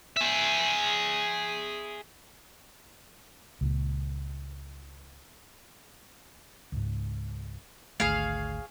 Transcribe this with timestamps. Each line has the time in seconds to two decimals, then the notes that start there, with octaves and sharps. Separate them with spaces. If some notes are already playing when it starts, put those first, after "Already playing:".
0.17 G#4 E5
3.61 C#2 A#2
6.72 C#2 G#2
8.00 G#1 D2 A3 G#4 C#5 F5